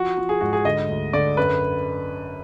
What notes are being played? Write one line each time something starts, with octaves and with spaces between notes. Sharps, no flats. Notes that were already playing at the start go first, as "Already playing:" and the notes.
Already playing: F3 F#4
F3
G#4
G#2 F#4
G#4
D3 D#5
D2
D3 D5
F#2 B4